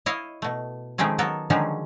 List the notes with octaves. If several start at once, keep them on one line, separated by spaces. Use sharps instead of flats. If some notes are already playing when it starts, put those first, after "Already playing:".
E4 C#5 D#5 F5
B2 A3
D#3 F3 G#3 A3 C4 C#4
F#3 B3 A4 A#4
D3 D#3 F3 F#3 G#3 C#4